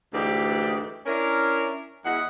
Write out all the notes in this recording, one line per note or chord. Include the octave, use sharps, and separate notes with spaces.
D2 G#2 E3 G4 D5
C#4 D4 E4 A#4
E2 G#3 F#5